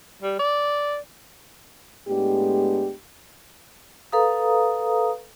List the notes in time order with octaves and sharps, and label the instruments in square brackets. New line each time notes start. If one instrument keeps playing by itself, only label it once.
[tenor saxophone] G3
D5
[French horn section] A2 G#3 B3 D4 G4
[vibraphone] A4 B4 F5 A#5 D#6